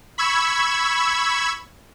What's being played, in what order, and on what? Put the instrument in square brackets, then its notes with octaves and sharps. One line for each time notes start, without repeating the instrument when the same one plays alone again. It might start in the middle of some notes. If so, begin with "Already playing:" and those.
[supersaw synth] B5 C#6 E6 G#6